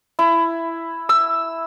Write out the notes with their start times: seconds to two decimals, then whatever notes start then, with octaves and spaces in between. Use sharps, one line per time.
0.19 E4
1.09 E6